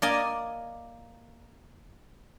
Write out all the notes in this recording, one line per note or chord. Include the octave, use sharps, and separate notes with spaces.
A#3 D5 D#5 G#5